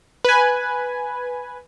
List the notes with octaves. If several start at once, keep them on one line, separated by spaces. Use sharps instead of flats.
B4 G#5